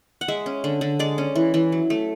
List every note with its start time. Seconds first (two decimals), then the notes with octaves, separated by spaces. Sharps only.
0.21 F#5
0.28 G#3 E5
0.46 C#4
0.64 D3
0.81 D3
0.99 G#3 D5
1.18 C#4
1.35 E3
1.54 E3
1.72 F#3
1.90 A3